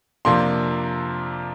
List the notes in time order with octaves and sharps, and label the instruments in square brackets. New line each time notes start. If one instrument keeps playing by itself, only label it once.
[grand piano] F2 C3 F3 A#3 D4 C6